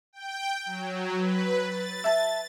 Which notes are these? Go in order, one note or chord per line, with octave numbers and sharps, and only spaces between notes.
G5
F#3
B4
A6
E5 A5